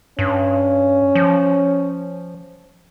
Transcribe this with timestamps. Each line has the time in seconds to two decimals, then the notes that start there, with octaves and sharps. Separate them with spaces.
0.19 G2 C#4
1.15 F3